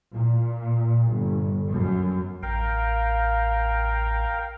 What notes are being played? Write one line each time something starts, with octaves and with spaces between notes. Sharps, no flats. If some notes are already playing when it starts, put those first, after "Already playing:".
A#2
G1
F#2
A1 A#4 F5 G5